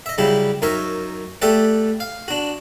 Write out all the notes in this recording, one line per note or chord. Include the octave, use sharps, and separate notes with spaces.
D#5 E5
C#3 F#3 G3 E4 G4
F#2 D#4 A#4 C#5 E5
A3 G4 D5 E5 F#5
F5
D4 F#4